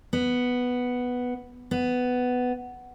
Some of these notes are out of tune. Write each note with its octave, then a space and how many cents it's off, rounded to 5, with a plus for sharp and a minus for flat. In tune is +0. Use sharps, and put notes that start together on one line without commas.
B3 +0
B3 +10